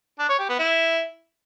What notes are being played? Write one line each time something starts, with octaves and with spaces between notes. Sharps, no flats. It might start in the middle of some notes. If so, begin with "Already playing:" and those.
D4
C#5
G4
B3
E4